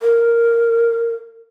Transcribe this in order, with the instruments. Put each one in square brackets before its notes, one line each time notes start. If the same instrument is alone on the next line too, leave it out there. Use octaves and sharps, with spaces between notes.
[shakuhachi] A#4